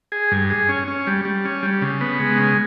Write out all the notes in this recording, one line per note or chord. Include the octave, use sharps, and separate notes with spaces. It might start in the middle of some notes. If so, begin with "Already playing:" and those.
G#4
G2
G#4
C#4
C#4
G3
G3
C#4
G3
C#3
B3
G#3
C#3